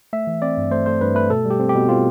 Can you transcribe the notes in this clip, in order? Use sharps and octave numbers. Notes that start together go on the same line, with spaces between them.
A3 E5
E3
C4 D5
G2
A3 C5
A3 C5
G2 B4
A3 B4
B2 A4
G3
G4
C4
G4
B2
C4 F4